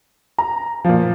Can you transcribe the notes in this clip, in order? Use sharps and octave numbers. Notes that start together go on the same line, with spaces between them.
A#5
A#2 F3